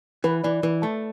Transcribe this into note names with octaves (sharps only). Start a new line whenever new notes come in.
E3 B4
E3 D5
E3 B4
A3 A5